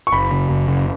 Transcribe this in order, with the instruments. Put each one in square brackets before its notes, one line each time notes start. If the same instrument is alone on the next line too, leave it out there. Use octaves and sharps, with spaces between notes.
[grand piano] C#6
[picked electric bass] F#1 [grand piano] B5
[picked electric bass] C#3
F#1
C#3